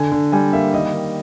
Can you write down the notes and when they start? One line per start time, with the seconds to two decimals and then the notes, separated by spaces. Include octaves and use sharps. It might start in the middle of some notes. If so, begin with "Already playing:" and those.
Already playing: D3 G#5
0.12 D3
0.32 G3 G#5
0.53 A#3 E5
0.74 D#3 D#5
0.94 D#3